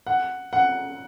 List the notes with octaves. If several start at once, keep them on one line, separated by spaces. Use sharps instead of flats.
F#5
F#5